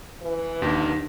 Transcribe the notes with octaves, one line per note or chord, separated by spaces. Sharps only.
E3
D#2 D#3 D4